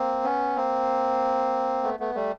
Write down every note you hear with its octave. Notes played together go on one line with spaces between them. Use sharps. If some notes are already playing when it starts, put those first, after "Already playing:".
Already playing: A#3 C4
B3 C#4
A#3 C4
A3 B3
A3 B3
G3 A3